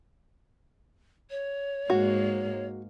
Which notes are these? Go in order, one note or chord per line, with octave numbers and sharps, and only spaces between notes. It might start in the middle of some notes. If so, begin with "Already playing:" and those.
C#5
G#2 G#3 A#3 F#4